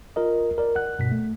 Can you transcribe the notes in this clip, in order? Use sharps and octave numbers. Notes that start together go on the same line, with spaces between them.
F4 A#4 D#5
A#4 D5
F#5 F#6
G2 B2 B6
A3